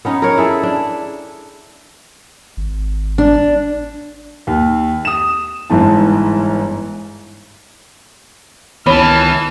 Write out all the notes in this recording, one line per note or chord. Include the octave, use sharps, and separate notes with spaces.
B3 C#4 D#4
A#4 C#5
E4 G#4 A4
D4
G#1
D4
D#2
D#6 E7
G1 G#2 E3 A5
C#2 D#3 E3 B3 C#5 A5 B5 F6